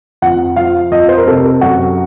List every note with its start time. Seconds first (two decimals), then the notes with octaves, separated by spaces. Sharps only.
0.22 F2 F#5
0.56 F3 F5
0.91 F2 D#5
1.09 C5
1.17 A#4
1.27 C3 A4
1.61 F#2 F#4